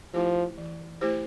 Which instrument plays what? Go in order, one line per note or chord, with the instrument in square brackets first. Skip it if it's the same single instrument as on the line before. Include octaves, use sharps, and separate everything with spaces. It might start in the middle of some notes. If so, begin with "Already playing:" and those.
[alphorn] F3 [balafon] A3 E4 G4 C5
[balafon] E3
A3 E4 G4 C5